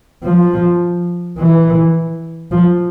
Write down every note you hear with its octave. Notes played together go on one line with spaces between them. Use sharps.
F3
E3
F3